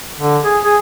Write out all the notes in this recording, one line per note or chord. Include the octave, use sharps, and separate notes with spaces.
D3
G#4
G#4